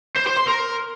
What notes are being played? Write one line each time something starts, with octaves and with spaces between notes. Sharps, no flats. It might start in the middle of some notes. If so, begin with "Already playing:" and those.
C5
C5
C6
A#4